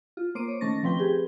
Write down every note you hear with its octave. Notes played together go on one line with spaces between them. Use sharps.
F4
A#3 C5 D6 D7 D#7
C#5
D#3 A3 C#4 C#6 A6 A#6
D#3 F3 C4 B4 G5 G7
G4 G#4 B4